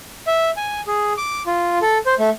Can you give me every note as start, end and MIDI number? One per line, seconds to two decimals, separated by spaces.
0.27 0.50 76
0.57 0.81 80
0.87 1.13 68
1.17 1.43 86
1.47 1.79 65
1.82 1.98 69
2.06 2.14 72
2.19 2.30 57